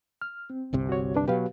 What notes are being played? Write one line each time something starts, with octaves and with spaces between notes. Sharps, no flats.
F6
C4
G1 C2 C3
F#4 C#5
D4 B4
B2 F#3 G4 B4 F5